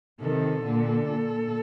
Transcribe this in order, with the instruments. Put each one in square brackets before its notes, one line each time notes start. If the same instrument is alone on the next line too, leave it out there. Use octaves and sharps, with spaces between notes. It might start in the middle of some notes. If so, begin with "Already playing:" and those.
[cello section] C3 D#3 [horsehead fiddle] A4
[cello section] A#2 D3
A#2